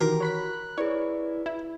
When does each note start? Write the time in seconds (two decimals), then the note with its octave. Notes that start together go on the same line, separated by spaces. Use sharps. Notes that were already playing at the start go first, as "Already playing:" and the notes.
0.01 D#3 E3 F#4 G4 A#4
0.20 C#5 B5 F#6 B6
0.78 E4 G#4 B4 C#5 D5
1.46 E4